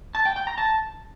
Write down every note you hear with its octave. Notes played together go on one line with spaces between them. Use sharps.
A5
G5
G5
A#5
A5